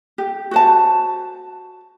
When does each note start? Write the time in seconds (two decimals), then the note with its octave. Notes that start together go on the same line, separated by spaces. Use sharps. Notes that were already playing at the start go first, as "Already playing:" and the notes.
0.18 G4
0.51 F#4 C5 A5